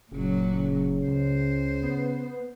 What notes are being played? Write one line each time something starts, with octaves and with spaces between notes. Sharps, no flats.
F#1 A#2 C#3 F#3
F#1 C#3
C#2 C5
B3